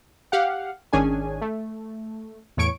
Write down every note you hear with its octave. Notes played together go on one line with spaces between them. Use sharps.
G4 F5 F#5
G#1 D#3 C#4 D4 G#4 G#5
A3
E2 A2 C#5 C#6 D7